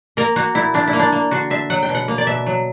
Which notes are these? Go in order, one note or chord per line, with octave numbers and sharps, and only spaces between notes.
A#3 A#4
A#3 F#4
A#2 E4
A#2 D4
E4
A#3
D4
A#3
D3 F#4
D3 E5
F#3 F#5
G5
B2
F#5
A#3
D5
B2 E5
F#3